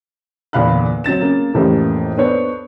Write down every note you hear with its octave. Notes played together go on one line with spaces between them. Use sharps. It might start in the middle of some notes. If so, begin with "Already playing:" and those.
G1 E2 A#2 F5 B5 F#6
F#3 C4 A6 E7
C#3 A#3
F2 A2 C#3 E3 G3 A#3
B3 D4 A4 C5 C#5